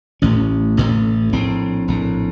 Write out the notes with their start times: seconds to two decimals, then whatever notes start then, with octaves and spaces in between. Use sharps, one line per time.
0.22 A1 A2 C#4
0.77 A1 A2
1.33 A#1 A2 C4
1.88 A#1 A2